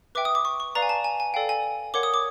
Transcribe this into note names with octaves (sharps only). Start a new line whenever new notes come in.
B4 E5 G5 D6
D#6
D6
C#6
C#6
B4 D5 F5 A#5
G#5
A5
G#5
G#5
A4 D5 F5 G5
G#5
A#4 C#5 F#5 D6
D#6
D6